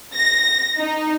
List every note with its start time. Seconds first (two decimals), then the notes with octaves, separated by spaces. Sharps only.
0.14 A#6
0.78 D#4